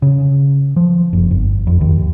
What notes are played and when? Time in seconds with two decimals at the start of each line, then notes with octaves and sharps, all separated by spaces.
0.02 C#3
0.76 F3
1.13 F#1
1.31 G1
1.67 F2
1.81 D#2